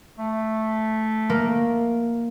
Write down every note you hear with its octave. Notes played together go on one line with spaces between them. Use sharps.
A3
A#3